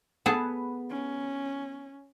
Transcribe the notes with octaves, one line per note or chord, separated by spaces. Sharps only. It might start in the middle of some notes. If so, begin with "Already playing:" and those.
B3 G#4 A4
C#4